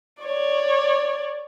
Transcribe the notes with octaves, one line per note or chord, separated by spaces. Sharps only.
C#5 D5